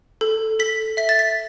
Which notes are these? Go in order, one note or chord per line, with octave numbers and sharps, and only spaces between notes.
A4
A4 B6
E5 B6
A6
B6